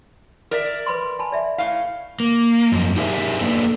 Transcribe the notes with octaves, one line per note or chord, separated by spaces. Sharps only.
A#4 D5 E5
B4 B5 C6
G#5 A5 B5
D5 E5
A2 F5
A#3
F#2 F3
D#4 G4 G#4 A#4 C5 E5
A#3 B3 D4 A4